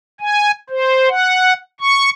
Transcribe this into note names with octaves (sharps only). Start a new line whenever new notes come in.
G#5
C5
F#5
C#6